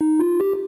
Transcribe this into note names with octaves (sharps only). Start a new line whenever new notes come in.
D#4
F4
G4